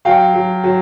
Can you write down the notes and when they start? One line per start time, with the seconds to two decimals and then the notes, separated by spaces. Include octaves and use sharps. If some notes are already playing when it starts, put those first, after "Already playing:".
0.05 F#3 F5 G5
0.34 F#3
0.64 F#3